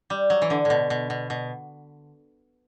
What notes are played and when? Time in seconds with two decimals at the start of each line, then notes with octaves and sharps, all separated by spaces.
0.10 G3
0.30 F#3
0.42 E3
0.50 D3
0.65 A2
0.70 B2
0.90 B2
1.10 B2
1.30 B2